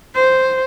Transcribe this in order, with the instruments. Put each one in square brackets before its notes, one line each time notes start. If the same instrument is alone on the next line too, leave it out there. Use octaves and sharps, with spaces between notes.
[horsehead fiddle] C5